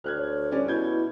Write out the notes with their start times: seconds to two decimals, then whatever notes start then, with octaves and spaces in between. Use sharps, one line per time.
0.04 D2 F6 F#6 G#6
0.18 C#5
0.51 G3 C#4 D5
0.68 B2 E4 G6 G#6